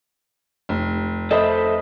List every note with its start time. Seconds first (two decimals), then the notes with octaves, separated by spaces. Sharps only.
0.69 F1
1.31 A4 C5 D#5 E5 B5